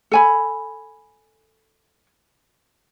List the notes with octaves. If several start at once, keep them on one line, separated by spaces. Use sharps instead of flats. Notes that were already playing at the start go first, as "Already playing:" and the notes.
A4 G#5 B5